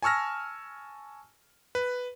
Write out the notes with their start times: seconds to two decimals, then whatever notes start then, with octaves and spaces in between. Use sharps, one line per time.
0.02 G#5 A5 C#6 E6 F6 A#6
1.75 B4